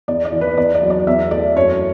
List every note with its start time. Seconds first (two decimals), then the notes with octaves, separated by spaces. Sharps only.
0.08 E2 D5
0.25 D5
0.32 E3
0.41 B4
0.57 E2 D5
0.75 D5
0.82 F#3
0.90 D5
1.07 E2 E5
1.31 A3 D5
1.56 F#2 C#5